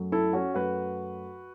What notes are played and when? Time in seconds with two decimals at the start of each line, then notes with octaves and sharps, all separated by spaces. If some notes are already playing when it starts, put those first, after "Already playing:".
Already playing: F#2 F#3 A3
0.12 E4 A4
0.33 C#4 F#4
0.54 F#2 F#3 A3 F#4 B4